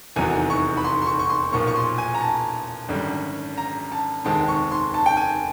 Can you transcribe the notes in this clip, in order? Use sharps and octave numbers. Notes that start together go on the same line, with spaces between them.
F1 E2 C3 D#3 F#3 G#5
C#6
B5
C6
C6
C#6
C#6
C6
B1 A#2 F3 A#3 C#6
C#6
C6
G#5
A#5
A5
G#1 F#2 D3 G3
A#5
A5
F1 D#2 D#3 G#3 C4 A5
C#6
C6
A5
G5
G#5